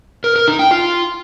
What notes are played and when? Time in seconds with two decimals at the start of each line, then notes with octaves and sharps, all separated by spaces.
0.24 A#4
0.36 A#4
0.47 D#4
0.59 G5
0.71 F4